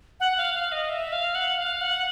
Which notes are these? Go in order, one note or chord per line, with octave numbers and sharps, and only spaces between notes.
F#5
F5
F5
D#5
E5
F5
F#5
F5
F#5